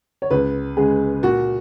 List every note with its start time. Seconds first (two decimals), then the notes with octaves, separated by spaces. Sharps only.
0.22 C#5
0.30 C#2 B4
0.77 C#3 G#3 G#4
1.23 A#2 F#4